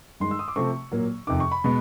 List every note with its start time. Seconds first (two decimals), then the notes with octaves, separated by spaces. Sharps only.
0.20 G2 D#3 G#3 C6
0.31 E6
0.39 D#6
0.48 D6
0.56 C3 F3 A3 C4 C#6
0.92 A#2 F#3 A#3
1.27 F2 C3 D#3 D6
1.40 C#6
1.52 B5
1.64 B2 G#3 B3